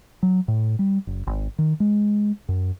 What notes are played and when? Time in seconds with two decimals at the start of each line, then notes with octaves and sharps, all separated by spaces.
0.23 F#3
0.48 A2
0.79 G3
1.07 F#1
1.27 G#1
1.58 D#3
1.80 G#3
2.49 F#2